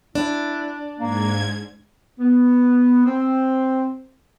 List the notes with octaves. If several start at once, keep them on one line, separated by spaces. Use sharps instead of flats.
D4 E4
G#2 A#3 G#6
B3
C4